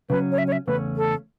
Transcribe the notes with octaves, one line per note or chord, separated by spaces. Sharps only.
C#3 F#3 C#4 B4
C#5
E5
C#5
E5
E2 C#3 A3 C#4 B4
A4